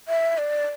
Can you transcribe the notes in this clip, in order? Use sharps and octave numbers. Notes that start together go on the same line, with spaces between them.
E5
D5